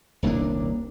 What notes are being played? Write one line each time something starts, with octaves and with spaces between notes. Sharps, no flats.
D#1 C2 A#3 D4